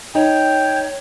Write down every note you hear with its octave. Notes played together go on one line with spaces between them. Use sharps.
D#4 C#5 G5